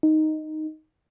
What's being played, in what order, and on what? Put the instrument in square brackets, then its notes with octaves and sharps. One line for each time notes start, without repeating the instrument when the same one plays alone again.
[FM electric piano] D#4